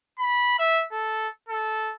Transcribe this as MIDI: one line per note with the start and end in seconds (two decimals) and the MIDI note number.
0.19 0.57 83
0.59 0.84 76
0.92 1.28 69
1.49 1.93 69